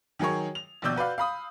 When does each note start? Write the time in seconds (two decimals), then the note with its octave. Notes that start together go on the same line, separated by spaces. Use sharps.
0.19 D#3 F#3 G#4 A#4 C#5
0.55 F7
0.82 A#1 D#2 B2 D5 E6 G6
0.96 F#4 B4 D5 F5
1.18 F5 B5 D#6